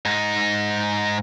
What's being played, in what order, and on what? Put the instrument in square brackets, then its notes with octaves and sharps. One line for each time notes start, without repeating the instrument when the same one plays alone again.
[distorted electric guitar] G#2 D#4